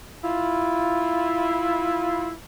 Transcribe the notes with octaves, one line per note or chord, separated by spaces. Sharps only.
E4 F4